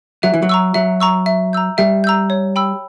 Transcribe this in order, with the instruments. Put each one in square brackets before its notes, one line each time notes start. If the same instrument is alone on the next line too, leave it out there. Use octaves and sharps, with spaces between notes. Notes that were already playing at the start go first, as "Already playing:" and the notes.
[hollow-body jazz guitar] F#3 [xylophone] E5
[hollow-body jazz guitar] E3
F#3
[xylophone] A#5 C#6 E6
[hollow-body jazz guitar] F#3 [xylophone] E5
[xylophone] A#5 C#6 E6
E5
A#5 E6 G6
[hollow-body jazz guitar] G3 [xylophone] E5
[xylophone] A#5 E6 G6
C#5
G5 B5 E6